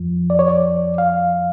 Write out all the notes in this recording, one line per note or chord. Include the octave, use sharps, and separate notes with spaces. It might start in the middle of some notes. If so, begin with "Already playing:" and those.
Already playing: F2 F3
D5
C#5
D5
F5